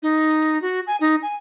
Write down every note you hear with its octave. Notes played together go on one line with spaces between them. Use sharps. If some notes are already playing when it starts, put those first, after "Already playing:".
D#4
F#4
G#5
D#4
G#5